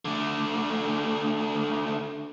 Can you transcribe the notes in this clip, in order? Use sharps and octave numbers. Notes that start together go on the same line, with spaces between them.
D3 A3